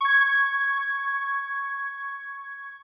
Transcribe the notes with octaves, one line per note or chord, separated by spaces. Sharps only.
C#6 G#6